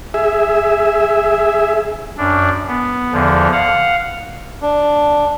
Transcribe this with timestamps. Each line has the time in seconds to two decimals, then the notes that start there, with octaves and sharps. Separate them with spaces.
0.14 G#4 E5
2.18 F#2 D4
2.68 B3
3.13 E2 D3 F3
3.52 F5 F#5
4.62 D4